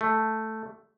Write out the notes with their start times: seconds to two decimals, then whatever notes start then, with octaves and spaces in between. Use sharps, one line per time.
0.01 A3